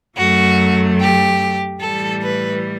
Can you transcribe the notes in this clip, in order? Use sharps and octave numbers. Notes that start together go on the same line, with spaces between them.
F#2 F#3 A3 F#4
G4
A2 E3 G3 A4
B4